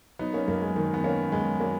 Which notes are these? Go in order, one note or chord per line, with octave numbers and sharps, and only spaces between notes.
F#3 B3 D#4
A#3 C#4
F#2 A#3
G#3
D#3 A#3
B3
D#3 A#3 C#4
F#2 G#3 B3
F#3 A#3